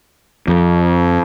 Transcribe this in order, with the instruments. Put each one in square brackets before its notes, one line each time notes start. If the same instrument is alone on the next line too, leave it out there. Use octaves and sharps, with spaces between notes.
[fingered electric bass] F2